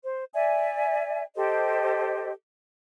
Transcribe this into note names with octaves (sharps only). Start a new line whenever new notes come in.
C5
D5 E5 G#5
G4 A4 C5 D#5